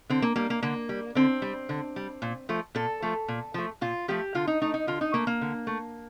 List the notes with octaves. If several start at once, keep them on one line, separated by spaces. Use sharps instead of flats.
D3 C4
A#3
G3 A#3
A#3
D3 A#3
G3
D3 C4
G3
D3
G3
A#2
F3 A3
A#2 A4
F3 A3
A#2
F3 A3
A#2 F4
F3 A3 G4
D3 F4
D#4
A3 D#4
D#4
D3 F4
D#4
A3 A#3
A#3
D3
A3